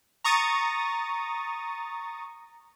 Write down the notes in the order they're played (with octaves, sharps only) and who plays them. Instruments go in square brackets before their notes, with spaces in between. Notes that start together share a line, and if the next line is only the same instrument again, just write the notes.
[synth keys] A#5 C#6 D#6 A6